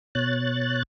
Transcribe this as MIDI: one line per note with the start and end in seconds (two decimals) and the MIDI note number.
0.15 0.83 47
0.15 0.83 73
0.15 0.83 90
0.15 0.83 93